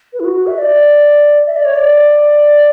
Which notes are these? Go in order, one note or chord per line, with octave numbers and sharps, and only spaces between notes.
B4
E4
F#4
F#4
E5
D5
E5
D5
C#5
D5